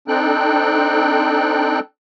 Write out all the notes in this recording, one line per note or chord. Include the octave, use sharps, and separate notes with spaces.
C4 D4 D#4 A4 G5 F#6